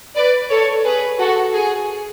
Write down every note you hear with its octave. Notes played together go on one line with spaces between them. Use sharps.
B4 D5
A4 C#5
G#4 B4
F#4 A4
G#4